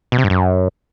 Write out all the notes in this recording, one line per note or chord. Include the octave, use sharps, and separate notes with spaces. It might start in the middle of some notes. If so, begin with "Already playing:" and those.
B2
C3
G2
F#2